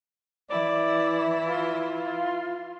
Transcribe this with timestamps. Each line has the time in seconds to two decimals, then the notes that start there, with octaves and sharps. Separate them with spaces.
0.50 E3 E4 D5
1.46 F4